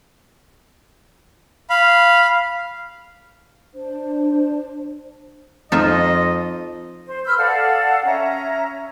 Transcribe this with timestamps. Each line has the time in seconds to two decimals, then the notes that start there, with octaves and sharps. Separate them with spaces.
1.70 F5 B5
3.74 D4 C5
5.72 F2 D#4 F4 D#5 E5
7.06 C5
7.25 B4 E6 F6 G6
7.38 A4 D5 F5 F#5
8.05 C#4 E5 A#5